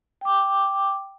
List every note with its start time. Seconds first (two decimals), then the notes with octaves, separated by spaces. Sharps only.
0.21 G5 D6